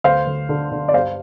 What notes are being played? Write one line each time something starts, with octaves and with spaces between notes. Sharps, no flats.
D2 C5 F5
D2
D3
D3
D5
G2 C5 F5